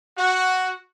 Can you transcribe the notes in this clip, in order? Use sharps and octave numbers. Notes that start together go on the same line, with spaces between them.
F#4